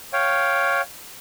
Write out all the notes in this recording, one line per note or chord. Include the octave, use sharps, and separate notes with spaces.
C#5 F5 G5